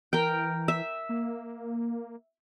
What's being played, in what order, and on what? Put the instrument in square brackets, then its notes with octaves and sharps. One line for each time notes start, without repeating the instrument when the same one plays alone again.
[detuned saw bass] E3 [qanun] A#4 G5
[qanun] E5
[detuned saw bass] A#3